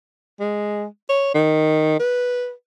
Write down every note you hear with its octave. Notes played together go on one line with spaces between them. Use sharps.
G#3
C#5
D#3
B4